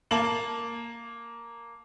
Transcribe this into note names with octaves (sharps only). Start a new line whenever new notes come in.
A#3 A5 F#7